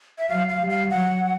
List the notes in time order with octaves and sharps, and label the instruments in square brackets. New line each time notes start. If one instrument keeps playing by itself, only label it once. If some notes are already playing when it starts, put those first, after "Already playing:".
[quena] E5
[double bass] F#3 [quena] F5
[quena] F5
[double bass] G3
[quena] F5
[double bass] F#3 [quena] F#5